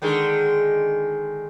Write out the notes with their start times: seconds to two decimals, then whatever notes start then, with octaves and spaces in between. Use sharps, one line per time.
0.02 D3 D#3 G#3